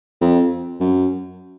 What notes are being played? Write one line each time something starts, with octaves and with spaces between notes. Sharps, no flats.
F2
F#2